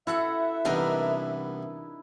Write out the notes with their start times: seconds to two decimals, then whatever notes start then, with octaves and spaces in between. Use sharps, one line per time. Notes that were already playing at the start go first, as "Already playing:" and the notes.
0.07 E4 F#4 A4 E5 F#5
0.65 C2 E3 B3 D4 D#4 A#4